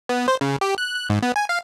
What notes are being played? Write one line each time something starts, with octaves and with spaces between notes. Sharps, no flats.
B3
C5
C#3
G4
F#6
F#6
G#2
B3
G#5
F5